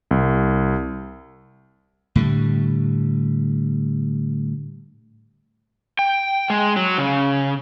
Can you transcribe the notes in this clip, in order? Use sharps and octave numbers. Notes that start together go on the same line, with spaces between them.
C2
A2 D3 G3
G5
G#3
F#3
C#3